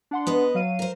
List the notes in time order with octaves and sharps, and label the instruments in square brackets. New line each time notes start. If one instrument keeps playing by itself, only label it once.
[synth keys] D4 F#5 C6
[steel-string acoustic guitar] B3 B4 D#5
[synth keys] F#3 F5 D#7
[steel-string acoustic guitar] A#4 C5